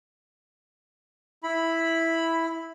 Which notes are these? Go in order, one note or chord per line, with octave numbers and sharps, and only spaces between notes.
E4 B5